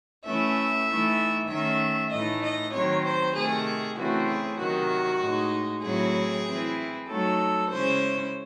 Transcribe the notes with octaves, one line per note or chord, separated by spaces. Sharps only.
E3 A3 C#4 E5
E3 A3 D#4
D#3 A3 C#4 E5
A2 E3 A3 D#4 D#5
D#5
D#3 F#3 C4 C#5
C5
C3 D#3 A3 G#4
C#3 E3 A3 C4 F#4
G#4
C3 D#3 F#3 F#4
A2 G#3 D#4
A2 F#3 C4 E4 G#4
E3 C4 E4
F#3 A3 D#4 A4
C#3 G#3 C#4 E4 C5